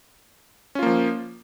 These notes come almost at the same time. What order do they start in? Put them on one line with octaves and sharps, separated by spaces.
C#4 F4 A#3 F3